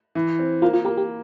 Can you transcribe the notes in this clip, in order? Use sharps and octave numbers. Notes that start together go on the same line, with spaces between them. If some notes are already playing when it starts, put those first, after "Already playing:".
E3
C4
A#3 F4
F4
A#3 G4
G4